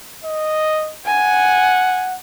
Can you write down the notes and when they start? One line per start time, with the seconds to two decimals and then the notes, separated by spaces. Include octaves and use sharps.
0.24 D#5
1.06 F#5 G#5